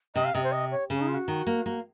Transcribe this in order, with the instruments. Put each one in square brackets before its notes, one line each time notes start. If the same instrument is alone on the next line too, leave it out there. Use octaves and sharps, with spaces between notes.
[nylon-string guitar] C3 [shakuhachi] D#5
[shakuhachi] F5
[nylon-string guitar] C3 [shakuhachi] D#5
[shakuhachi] C5
D#5
C#5
[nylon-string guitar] C#3 [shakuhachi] C#4
[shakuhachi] D#4
F4
F#4
[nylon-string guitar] D#3
A#3
A#3